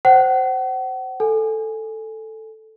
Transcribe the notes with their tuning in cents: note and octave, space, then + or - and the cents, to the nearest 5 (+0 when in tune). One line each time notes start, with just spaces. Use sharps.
C5 +0 F#5 +40
A4 +0 G#5 +0